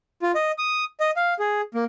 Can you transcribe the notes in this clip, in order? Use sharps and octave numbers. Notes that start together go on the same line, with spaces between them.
F4
D#5
D#6
D#5
F5
G#4
A#3